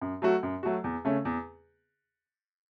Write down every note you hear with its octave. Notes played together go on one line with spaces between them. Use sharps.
F#2
F#3 A3 F#4
F#2
F#3 A3 F#4
E2
C#3 A3 C#4
E2